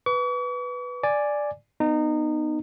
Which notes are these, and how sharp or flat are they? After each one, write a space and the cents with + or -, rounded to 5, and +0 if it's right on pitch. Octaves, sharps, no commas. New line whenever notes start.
B4 +0 C#6 +45
D5 +0 G#5 +0
B3 +0 D#4 -25